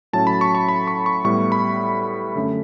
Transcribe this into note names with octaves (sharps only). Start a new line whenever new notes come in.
A2 F#3 C#4 A5
B5
C#6
C#6
B5
C#6
C#6
A2 G3 B3 C#6
B5
F#2 D3 A3 C#4